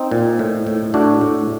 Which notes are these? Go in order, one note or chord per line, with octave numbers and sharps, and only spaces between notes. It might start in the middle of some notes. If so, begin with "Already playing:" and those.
Already playing: C4 D#4
A#2
A2
A2
A2 D4 F#4
A2